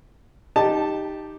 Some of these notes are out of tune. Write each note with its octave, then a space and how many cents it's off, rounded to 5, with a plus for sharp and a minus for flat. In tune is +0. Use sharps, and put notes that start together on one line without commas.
D#4 +0 G4 +0 A5 +0